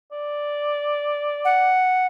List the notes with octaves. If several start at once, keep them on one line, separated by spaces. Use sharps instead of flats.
D5
F#5